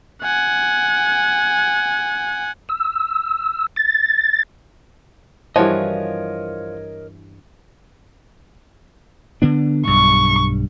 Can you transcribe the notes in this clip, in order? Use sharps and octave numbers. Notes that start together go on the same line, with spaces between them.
F#5 G#5
E6
A6
G2 E3 F3 F#4 A#4 C#5 D#5
D3 B3 D4
B1 G2 C#6